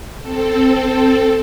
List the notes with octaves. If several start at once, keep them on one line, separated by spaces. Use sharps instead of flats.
C4 A4